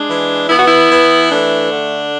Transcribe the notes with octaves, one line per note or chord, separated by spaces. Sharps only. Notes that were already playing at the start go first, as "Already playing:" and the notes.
Already playing: G#3 D4
E3
B3 E4
F#4
E4
E3
A3 D4
D3